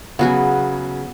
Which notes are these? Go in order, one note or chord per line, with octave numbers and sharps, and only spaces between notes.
C#3 F#3 B3 F#4 G#4